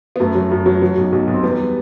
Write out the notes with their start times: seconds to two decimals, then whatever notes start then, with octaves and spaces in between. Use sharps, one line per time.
0.16 B3
0.20 F#2 A3
0.35 F#3
0.51 F#2
0.66 F#3
0.82 F#3
0.98 B1
1.12 B1
1.27 B1
1.33 C4
1.44 E2 G3 B3